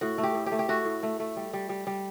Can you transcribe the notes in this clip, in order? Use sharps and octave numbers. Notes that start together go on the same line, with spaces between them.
A2 F#4
A3
G4
A2
G4
A3
G4
A3 F#4
A2
A3
A3
G3
G3
G3
G3